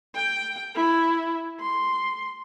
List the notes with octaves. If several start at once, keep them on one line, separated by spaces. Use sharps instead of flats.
G5
E4
C6